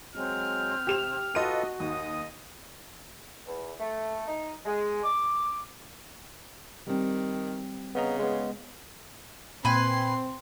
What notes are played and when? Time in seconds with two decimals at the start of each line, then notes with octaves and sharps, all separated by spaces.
0.16 F#3 G#3 C4 F6
0.87 C3 G4 E7 F7
1.35 F4 F#4 A4 B4 D#5 D#7
1.80 D#2 D#5 D#6
3.46 E2
3.80 A3
4.28 D#4
4.65 G#3
5.04 D6
6.87 D#3 G3 C4
7.95 C#3 B3 D#5 A#5
8.19 G#3 B3
9.65 A#2 C4 B4 G5 G#5 C6